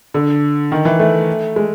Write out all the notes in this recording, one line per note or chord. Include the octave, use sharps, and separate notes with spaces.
D3
D#3
E3
A3
G#3